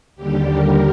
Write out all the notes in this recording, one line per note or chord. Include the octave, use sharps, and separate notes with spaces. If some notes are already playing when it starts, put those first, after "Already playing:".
D#2 D3 G3 G4
A#4